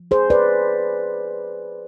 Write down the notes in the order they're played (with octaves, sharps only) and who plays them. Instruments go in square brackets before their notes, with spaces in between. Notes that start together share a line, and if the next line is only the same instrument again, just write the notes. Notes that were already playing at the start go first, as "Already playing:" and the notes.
Already playing: [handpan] F3
G#4 C5
B4 D5